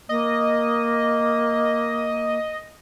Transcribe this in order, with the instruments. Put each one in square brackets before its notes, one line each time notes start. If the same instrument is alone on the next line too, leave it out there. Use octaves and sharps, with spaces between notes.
[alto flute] A#3 [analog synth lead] D#5